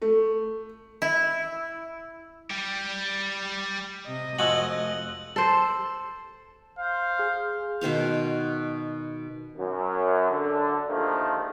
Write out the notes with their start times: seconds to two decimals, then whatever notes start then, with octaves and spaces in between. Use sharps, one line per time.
0.02 A3
1.02 E4
2.50 G3 G4
4.08 C3 D#5
4.39 F1 F3 G#3 F#4 E6 F#6 F#7
5.36 A4 C5
6.79 C5 F5
7.19 G#4
7.81 B2 D#3 C5 F5
9.57 F#2
10.30 D3
10.88 D#2 G#2 D3 D#3 F3 A3